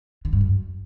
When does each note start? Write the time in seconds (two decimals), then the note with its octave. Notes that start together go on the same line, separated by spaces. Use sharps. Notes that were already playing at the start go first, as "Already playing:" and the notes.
0.25 D3
0.33 G2
0.41 F#2